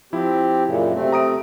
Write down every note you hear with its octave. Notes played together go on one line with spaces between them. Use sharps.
F3 C4 E4 G4
F#2 A#2 C#3
C3 A3 C4
A#5 D#6 D7